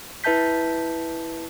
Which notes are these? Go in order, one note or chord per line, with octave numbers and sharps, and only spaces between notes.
E4 B4 E5 A5 G6 B6